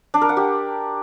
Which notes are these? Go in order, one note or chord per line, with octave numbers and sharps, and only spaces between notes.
D4
A#4
F#5
G4